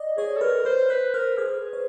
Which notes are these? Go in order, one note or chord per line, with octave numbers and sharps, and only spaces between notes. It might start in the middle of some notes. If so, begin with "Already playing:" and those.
Already playing: D5 D#5
G#4 C#5
A4
A#4 B4
B4 C5
B4 C5
A#4 C5
G#4 C5
C#5